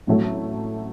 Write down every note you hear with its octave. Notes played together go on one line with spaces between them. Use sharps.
A1 A2 F#3 A3